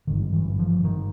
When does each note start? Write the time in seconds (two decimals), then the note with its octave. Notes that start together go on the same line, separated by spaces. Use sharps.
0.07 G#1 G2 D3 D#3
0.33 E3
0.59 F3
0.84 D#3